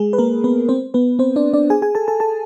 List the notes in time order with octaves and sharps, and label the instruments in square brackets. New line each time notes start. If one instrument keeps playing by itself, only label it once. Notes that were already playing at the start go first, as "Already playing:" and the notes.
Already playing: [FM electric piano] G#3 G#4
B4
A#3 A#4
B3 B4
C4 C5
B3 B4
C4 C5
D4 D5
D4 D5
G#4 G#5
G#4 G#5
A4 A5
A4 A5
A4 A5